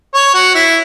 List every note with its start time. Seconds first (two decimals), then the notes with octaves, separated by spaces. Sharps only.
0.14 C#5
0.34 F#4
0.55 E4